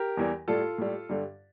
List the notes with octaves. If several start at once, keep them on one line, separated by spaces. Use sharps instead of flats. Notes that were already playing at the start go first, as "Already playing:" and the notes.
Already playing: G4 A#4
E2 E3 G3
A2 G3 F4 A4
A2 G3
G2 D3 G3